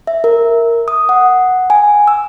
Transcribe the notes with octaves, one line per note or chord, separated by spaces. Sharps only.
E5
A#4
D#6
F#5
G#5
E6